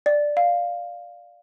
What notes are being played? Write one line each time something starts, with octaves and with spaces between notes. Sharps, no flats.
D5
F5